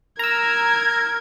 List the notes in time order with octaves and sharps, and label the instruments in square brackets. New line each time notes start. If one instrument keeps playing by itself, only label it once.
[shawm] A#4 [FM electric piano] A#5 E6 [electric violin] G#6